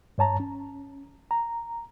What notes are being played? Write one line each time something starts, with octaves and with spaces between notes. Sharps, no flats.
G2 C#5 A5 A#5
C#4
A#5